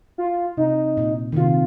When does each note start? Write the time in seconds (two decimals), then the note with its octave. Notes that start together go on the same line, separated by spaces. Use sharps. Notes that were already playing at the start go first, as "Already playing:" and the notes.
0.18 F4
0.57 C3 D#4
0.97 A#2
1.32 D#3
1.36 C3 F4